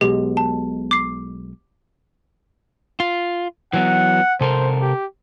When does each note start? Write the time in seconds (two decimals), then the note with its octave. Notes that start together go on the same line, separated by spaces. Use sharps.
0.01 B1 B2 G#3 G4
0.37 A5
0.91 D6 C7
3.00 F4
3.73 E3 F#3 B3 F#5
4.41 C3 A4 A#4 C5
4.82 G4